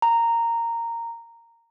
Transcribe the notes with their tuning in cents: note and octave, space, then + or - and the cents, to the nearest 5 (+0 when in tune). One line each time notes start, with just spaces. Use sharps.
A#5 -10